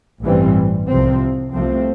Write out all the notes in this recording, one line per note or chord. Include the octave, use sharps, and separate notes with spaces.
A1 G2 E3 G3 C4
C2 C3 F3 C4
C2 C3 F3 A3 C4